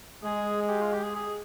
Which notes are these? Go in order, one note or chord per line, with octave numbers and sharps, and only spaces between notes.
G#3 G#4
G#4
G4
F4
G4
G#4
G#4